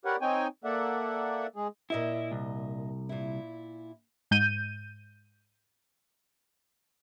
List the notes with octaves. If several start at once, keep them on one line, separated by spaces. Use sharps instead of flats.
G4 A#4 B4 C#5 D5 F#5
C4 D#4 C#5 G5 G#5
A#3 A4 D5 E5 F#5
G#3 G#4
A#2 E4 D#5 E5
C2
A#2 E4
G#2 G6 D#7